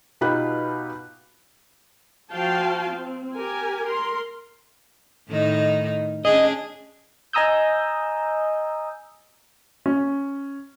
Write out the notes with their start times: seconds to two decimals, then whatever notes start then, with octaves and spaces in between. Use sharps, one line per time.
0.21 B2 D#4 F4 G4 B5 F#6
2.32 F3 F#4 F5 G5 A5
2.90 C4
3.37 G4 A#4 G#5
3.86 A#4 C6
5.29 A2 D#3 D#4
6.25 C#4 D4 G#4 D#5
7.33 D#5 G#5 A#5 D#6 E6 G6
9.86 C#4